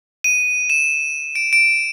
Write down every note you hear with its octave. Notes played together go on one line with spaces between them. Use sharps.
D#7
E7
D7
D7